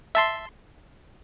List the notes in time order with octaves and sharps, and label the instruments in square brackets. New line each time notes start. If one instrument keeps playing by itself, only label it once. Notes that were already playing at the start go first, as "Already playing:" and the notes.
[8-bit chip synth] E5 A5 C6